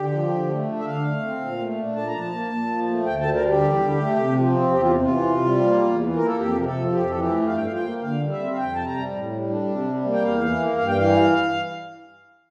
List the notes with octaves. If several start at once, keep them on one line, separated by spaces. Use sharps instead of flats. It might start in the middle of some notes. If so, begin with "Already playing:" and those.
Already playing: D3 G4
F3
D3
A3
D4
E5
D3 F5
A3
C4
A#2
A3
D4
A#2 A5
A#5
F3
A5
A#3
A#2
F3
A3
D2 G5
D3 A5
A#4
G3 G4
E2
D3
A3
C3
F3
C4
E2 G4
F4
C3
F4
E3
C3
G3
A#3
E2
E3
A#3 A#4
A4
F2 G4
C3 A#4
A4
F3
F2 G4
E3 A4
G4
A3
G2 F5
G5
F3 F5
G5
A#3
D3 F5
G3
E5
C4
F5
F2 G5
C3 A5
A#5
G3
A2
G3
D4
C3
G3
A#3
G5
E2 F5
E3
A#3
G2 F5
G5
E3 F5